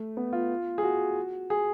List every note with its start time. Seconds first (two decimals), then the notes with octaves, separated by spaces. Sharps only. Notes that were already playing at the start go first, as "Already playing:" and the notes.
Already playing: A3
0.17 B3
0.33 F4
0.78 G#4
0.83 F#4
1.50 G#4